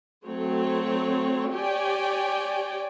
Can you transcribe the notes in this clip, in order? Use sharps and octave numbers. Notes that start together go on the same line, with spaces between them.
F#3 A3 C4 C#5
G4 C#5 D5 G5 G#5